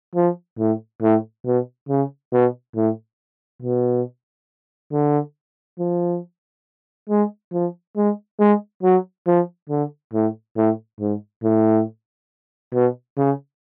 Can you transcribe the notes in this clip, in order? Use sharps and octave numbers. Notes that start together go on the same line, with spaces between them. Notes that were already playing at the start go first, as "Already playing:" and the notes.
F3
A2
A2
B2
C#3
B2
A2
B2
D3
F3
G#3
F3
G#3
G#3
F#3
F3
D3
A2
A2
G#2
A2
B2
C#3